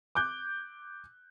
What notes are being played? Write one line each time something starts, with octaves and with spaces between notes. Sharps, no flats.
D6 F#6 G6